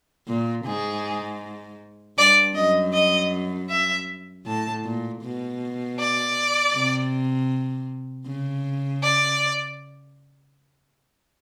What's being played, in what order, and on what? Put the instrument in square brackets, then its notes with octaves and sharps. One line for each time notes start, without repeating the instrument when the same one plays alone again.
[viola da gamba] A#2
[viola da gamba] G#2 [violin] G#4
[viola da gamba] G2 [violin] D5
[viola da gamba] F#2 [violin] D#5
[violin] D#5
E5
[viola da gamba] A2 [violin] A5
[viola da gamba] A#2
B2
[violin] D5
[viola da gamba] C3
C#3
[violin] D5